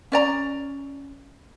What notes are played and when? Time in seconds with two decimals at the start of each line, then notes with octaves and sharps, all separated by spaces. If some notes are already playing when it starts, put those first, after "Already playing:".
0.12 C#4 D5 A#5